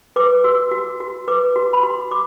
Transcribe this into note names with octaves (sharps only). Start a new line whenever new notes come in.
B4 D6
F#4 E6
F#4
F#4
B4 D6
F#4
B5
F#4 C6
F#4 D6